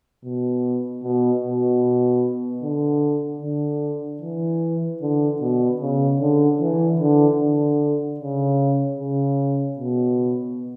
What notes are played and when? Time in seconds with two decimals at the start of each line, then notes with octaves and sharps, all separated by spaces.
0.24 B2
1.03 B2
1.43 B2
2.62 D3
3.42 D3
4.21 E3
5.02 D3
5.41 B2
5.81 C#3
6.20 D3
6.60 E3
7.00 D3
7.40 D3
8.19 C#3
8.99 C#3
9.79 B2